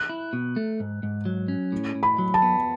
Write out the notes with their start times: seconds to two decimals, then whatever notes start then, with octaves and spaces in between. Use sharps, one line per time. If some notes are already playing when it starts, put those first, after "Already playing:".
Already playing: F#6
0.09 E4
0.33 B2
0.56 A3
0.80 G#2
1.03 G#2
1.25 F#3
1.48 C#4
1.72 A2
1.95 A2
2.03 B5
2.19 F#3
2.34 A5
2.42 B3